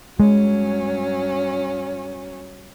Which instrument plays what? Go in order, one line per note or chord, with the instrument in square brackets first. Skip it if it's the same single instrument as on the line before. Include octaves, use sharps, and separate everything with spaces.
[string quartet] G2 F#3 C#4 [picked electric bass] G#3